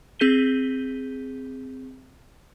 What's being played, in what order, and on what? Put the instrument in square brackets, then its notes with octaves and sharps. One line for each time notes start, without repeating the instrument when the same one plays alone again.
[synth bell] C4 G#4 G6 B6 D#7 G7